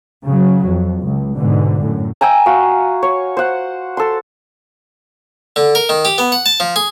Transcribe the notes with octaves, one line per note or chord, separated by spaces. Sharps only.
C#3 F#3
F2
C#2
G#2 B2 D3
F#2 A2
E5 G5 G#5 A#5
F#4 F5
C#5
C5 F#5
A4 C6
D3
A#4
D#3
G4
B3
F#5
A5
F3
G#4